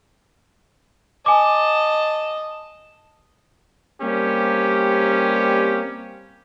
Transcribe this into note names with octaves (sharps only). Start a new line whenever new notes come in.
D#5 G#5 A5 D6
G3 A#3 C4 C#4 G4